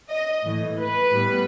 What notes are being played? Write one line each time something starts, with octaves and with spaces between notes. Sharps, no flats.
D#5
A2 E3 A3
B4
A2 G3 B3